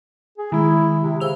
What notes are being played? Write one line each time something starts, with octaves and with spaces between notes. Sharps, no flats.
G#4
D#3 G#3 E4
C3
C#3 C5 E6 F7